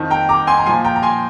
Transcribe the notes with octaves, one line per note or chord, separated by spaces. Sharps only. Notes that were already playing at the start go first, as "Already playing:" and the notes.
Already playing: F2 D#3
G5 A#5
A#5 D6
G#5 C6
A#5
A#2 F3 G#5 C6
G5 A#5
A#5
G#5 C6